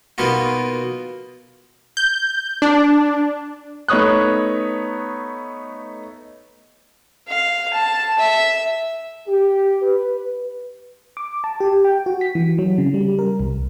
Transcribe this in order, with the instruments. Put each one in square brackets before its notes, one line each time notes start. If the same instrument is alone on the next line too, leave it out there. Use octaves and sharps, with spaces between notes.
[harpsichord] B2 A#3 B3 D#4 F4 F#4
[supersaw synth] G6
D4
[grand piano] A3 B3 D#4 C#5 D#6 F#6
[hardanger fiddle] F5
A5
E5
[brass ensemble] G4
B4
[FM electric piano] D6
A5
G4
G5
F#4
B6
E3
F#3
C#3
G3
A#4
C2